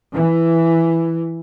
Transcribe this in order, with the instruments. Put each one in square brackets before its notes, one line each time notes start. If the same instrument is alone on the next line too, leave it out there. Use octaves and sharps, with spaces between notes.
[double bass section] E3